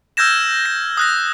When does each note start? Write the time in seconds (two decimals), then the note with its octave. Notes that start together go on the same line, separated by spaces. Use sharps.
0.17 E6 F6 G6 G#6 A#6 E7
0.66 A#6
0.97 D#6 F#6 A#6